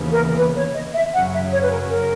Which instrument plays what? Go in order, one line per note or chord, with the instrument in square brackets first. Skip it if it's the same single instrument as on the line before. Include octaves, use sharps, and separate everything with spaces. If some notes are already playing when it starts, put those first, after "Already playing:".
Already playing: [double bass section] D#2 C#3 E3 B3
[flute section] A#4
B4
C#5
D#5
E5
[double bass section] F#2 C#3 F#3 C#4 [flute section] F#5
[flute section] E5
C#5
B4
A#4
A#4